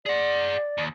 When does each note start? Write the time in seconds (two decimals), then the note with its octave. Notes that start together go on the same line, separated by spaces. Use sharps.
0.06 G#4 D5 F#5
0.78 D#2